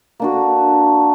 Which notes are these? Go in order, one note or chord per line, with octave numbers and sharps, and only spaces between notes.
A#3 D4 F#4